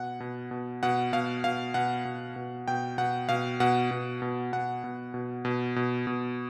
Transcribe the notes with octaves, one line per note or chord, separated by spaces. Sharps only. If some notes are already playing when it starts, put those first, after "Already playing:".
Already playing: B2 F#5
B2
B2
B2 F#5
B2 F5
B2 F5
B2 F#5
B2
B2
B2 G5
B2 F#5
B2 F5
B2 F#5
B2
B2
B2 F#5
B2
B2
B2
B2
B2